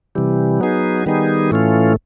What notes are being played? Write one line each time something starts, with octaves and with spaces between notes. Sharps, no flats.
C3 E3 G3
F#3 B3 D#4 G#4
D#3 G3 B3 D#4 G#4
A2 E3 A3 C#4 F4